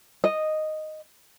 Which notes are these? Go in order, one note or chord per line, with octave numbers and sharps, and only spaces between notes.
D#5